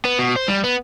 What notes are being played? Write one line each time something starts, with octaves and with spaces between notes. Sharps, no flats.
B3
B2
C5
G3
B3